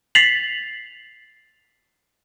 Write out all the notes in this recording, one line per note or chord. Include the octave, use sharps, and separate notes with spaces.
A6 B6 C7 F7 F#7